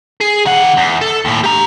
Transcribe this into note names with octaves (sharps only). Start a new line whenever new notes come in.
G#4
D#3 F#5
E2
A4
D#2 A2
G4 A#5